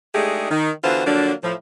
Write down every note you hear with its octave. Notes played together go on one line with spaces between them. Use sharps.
G#3 A3 D4 D#4 G4 G#4
D#3
D3 E3 B3 F4 F#4 C5
D3 F3 F#3 A#3 D4
A2 F3